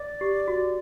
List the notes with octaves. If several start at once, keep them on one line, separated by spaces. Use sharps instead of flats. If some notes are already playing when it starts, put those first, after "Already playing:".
Already playing: D5
G4
F#4